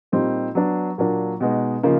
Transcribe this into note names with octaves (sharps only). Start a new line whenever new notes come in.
A#2 G3 C4 D#4
F#3 B3 D4
A#2 F#3 A#3 D4
B2 G#3 B3 D#4
C#3 F3 A#3 D#4